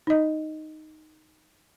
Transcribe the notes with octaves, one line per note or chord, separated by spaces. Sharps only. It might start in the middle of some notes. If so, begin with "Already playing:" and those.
D#4 D#5